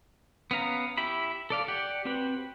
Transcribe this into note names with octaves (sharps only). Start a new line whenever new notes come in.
B3 C#4 F5 A#5
E4 G4 E5 B5
A4 D5 F5
G4 D5 F#5
C4 F#4 G4 B4